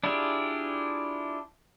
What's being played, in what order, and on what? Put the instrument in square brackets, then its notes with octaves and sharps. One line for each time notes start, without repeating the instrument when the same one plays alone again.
[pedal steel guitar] D4 E4 F4 G4 G#4